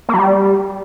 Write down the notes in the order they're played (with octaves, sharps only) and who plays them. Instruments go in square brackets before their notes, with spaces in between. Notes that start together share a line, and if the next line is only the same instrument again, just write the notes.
[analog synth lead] A#3
F#3
G3